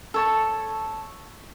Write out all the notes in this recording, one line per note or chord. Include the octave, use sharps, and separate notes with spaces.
A4 C#5 A5